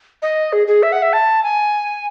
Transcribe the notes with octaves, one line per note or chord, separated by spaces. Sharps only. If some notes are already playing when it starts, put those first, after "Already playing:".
D#5
G#4
G#4
E5
F#5
E5
A5
G#5